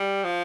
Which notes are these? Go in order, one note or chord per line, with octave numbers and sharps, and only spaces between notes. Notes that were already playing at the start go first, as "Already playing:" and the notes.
Already playing: G3
F3